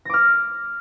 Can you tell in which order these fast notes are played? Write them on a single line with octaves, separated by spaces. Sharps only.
A#6 D6 F6